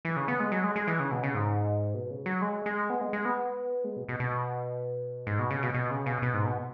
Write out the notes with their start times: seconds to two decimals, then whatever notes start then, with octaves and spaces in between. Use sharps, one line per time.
0.05 E3
0.17 C#3
0.28 B3
0.40 G#3
0.52 F#3
0.64 G#3
0.76 G#3
0.88 E3
1.00 C#3
1.11 B2
1.23 C#3
1.35 G#2
1.94 B2
2.10 C#3
2.26 F#3
2.42 G#3
2.66 G#3
2.90 B3
3.01 G#3
3.13 G#3
3.25 B3
3.84 G#3
3.97 B2
4.09 B2
4.20 B2
5.27 G#2
5.39 B2
5.51 C#3
5.63 B2
5.74 B2
5.91 C#3
6.06 B2
6.22 B2
6.34 G#2
6.46 B2